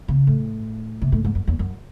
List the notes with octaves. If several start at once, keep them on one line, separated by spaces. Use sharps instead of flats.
C#3
A2
C3
A2
G#2
F#2
E2
F#2